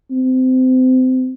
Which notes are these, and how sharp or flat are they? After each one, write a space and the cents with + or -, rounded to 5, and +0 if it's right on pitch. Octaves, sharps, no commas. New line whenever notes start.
C4 -25